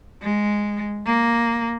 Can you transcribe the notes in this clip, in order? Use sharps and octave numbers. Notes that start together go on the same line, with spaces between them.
G#3
A#3